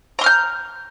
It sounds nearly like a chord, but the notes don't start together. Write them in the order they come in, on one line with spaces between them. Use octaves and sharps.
A#5 C6 F6 G6